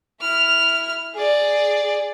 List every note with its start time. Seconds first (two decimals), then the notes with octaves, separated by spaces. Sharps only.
0.21 E4 F6
1.15 G#4 D5